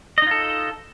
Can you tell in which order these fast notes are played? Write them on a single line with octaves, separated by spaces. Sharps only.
D#5 D#4 F4 A4